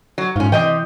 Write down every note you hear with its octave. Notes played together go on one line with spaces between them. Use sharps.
F#3
G#2 C#4 F4
C3 E3 D#5 G5